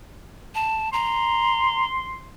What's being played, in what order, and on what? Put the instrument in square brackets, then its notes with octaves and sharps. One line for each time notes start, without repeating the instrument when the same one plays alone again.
[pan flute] A5
[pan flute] A#5 [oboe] C6